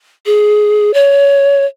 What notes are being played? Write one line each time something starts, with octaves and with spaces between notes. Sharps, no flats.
G#4
C#5